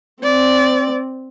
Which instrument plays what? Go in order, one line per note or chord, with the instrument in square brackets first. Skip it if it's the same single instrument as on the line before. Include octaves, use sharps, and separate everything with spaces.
[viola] C4 [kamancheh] D5